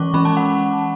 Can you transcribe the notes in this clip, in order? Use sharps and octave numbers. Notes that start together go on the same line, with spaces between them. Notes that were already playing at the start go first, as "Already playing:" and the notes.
Already playing: E3 G#3 C#4 C#6 D6
E3 G#3 C#4 B5
A5
F#5